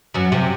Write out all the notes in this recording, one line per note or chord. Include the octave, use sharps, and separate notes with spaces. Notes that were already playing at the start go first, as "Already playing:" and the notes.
F#2 F#3
C3 C4